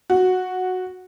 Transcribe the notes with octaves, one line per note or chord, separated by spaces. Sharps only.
F#4